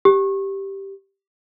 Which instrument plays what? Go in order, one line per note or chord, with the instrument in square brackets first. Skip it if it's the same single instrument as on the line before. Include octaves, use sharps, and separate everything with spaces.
[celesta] G4